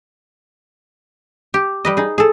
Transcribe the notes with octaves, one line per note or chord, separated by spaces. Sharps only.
G4
G3 B4 D#5
D#4 G#4
G#4 A4